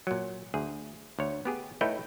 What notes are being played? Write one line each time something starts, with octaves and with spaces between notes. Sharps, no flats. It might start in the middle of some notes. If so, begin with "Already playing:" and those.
A#2 F#3
D2 G#4
D2 C#5
B3 G4 G#4
A3 D#4 E4 B4 C#5 G5